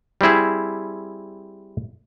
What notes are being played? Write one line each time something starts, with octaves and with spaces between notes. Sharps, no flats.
G3 C4 E4 G#4